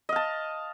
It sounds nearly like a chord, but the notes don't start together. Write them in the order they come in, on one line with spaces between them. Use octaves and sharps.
D#5 F5 A5